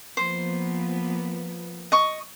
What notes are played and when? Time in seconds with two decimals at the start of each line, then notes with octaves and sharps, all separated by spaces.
0.17 F3 A#3 B3 C5
1.92 D#5 C#6